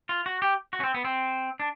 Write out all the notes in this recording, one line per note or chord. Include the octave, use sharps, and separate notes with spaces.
F4
F#4
G4
F#4
C#4
C4
B3
C4
D4